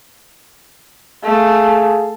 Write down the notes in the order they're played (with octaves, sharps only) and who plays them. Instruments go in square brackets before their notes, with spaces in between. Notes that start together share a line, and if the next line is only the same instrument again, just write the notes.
[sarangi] A3 [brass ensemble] G#4 F5